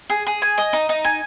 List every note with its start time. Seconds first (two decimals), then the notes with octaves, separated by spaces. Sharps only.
0.10 G#4
0.26 G#4
0.42 G#5
0.58 D#5
0.73 D#4
0.89 D#4
1.04 G#5